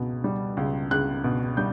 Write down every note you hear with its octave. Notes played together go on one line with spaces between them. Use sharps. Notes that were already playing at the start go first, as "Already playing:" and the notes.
Already playing: C#2 B2
G3
C#2
C#2 F#6
B2
G3 G6